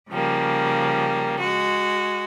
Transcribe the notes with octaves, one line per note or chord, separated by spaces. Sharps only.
C#3 F3 G3 A#3
G#3 F#4